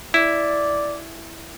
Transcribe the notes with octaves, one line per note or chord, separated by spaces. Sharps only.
E4 D5